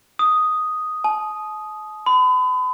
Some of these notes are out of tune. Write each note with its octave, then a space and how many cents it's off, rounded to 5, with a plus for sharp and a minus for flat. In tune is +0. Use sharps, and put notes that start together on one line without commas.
D#6 +0
A5 -45
B5 +40